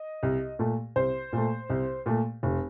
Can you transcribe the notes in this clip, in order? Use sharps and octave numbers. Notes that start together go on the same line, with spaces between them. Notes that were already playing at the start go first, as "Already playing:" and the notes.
Already playing: D#5
C2
A#2 A3
C2 C5
A#2 A3
C2
A#2 A3
F1